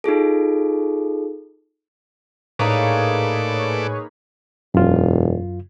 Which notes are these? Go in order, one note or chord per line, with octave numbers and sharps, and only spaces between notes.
D#4 F4 G#4 A4
A2 A3 A#3 D#4 G#4 B4 C#5 D5
E1 F#2 F4